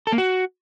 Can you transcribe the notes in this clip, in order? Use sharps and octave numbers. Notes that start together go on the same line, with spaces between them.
A4
A#3
F#4